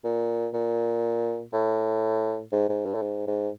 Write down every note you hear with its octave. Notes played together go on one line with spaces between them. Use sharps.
A#2
A#2
A2
G#2
G#2
G2
A2
G#2
G#2